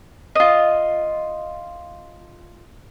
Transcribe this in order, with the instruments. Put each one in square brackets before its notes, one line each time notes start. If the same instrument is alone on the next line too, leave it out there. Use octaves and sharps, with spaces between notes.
[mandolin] F4 D#5